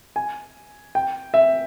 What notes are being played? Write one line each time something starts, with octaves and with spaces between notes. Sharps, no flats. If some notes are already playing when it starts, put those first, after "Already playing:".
G#5
G5
E5